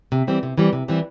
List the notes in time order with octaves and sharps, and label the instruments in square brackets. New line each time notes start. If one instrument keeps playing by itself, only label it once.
[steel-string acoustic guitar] C3
E3 G3 C4
C3
E3 G3 C4
C3
E3 G3 C4